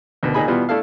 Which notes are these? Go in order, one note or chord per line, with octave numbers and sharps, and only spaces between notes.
D2 B2 D#3
A#2 D#3 D#4 G#4 G#5 B5
B2 E3 G3 B3 F4
A3 D4 E4 A4 F5